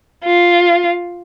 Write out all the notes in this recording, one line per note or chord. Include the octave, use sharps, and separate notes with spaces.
F4